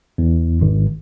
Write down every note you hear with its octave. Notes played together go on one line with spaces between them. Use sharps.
E2
G#1